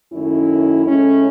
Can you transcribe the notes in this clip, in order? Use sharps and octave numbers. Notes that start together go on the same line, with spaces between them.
F#2 D#3 A3 C#4 E4
A2 G#3 A3 C#4